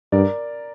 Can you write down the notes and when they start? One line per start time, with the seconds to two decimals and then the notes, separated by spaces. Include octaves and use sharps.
0.12 G2 A#4 D5